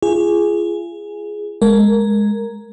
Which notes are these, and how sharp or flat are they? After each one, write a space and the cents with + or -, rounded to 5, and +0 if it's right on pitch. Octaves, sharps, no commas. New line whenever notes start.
F4 -35 G#4 +0
G#3 +0 A#4 +0